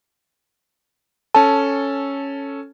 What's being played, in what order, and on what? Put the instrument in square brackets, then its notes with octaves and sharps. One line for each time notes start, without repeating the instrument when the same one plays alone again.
[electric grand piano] C#4 A4 [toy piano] A5